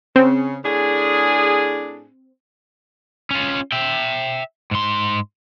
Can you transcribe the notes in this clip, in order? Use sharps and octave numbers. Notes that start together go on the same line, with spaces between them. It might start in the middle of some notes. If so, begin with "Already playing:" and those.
C#3 C4
A2 D4 G#4
C#4 F4
E5 G5
G#2 C6